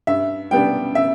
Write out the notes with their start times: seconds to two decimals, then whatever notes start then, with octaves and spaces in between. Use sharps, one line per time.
0.07 G2 E5
0.51 G3 B3 D4 G5
0.95 E5